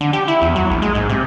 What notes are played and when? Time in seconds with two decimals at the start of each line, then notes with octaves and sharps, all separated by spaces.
0.01 D3
0.13 G4
0.28 E4
0.42 E2
0.56 F#3
0.70 A#1
0.82 G#3
0.95 G#2
1.09 C3